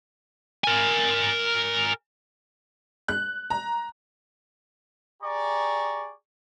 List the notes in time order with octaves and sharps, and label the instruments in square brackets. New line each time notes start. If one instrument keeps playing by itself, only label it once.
[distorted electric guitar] A#4 G#5
[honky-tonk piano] F#6
A#5
[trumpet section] G4 G#4 D5 A#5 C#6